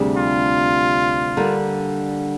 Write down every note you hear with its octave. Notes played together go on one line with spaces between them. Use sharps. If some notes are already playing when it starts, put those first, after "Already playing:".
Already playing: D2 C3 G3 D4 G#4
F4
D3 G3 A#3